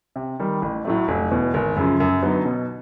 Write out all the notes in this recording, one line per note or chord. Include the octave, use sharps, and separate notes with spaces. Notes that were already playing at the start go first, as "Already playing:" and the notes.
C3
D#3 G3
A1
A2 F#3 A3
F1
E2 B2
G#1
F#2 C#3 F3
F#2
D3 F#3 B3 D#4
B2